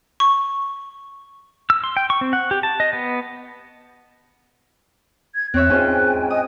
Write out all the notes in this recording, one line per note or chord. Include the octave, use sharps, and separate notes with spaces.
C#6
E6
C6
G5
C#6
C4
F#5
G4
A5
D#5
B3
G#6
E2 C4 C#5 E5 F#6
G#2 C#4 F4 G5 G#5
D#5 D#6